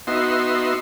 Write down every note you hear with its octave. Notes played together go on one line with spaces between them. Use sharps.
B3 D#4 F#4 E5 C6